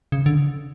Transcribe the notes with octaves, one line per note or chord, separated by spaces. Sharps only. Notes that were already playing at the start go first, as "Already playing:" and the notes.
C#3
D3